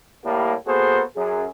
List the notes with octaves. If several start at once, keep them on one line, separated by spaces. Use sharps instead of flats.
A2 G3 A#3
A#3 B3 F#4 G#4 A4 C5
F#2 G#4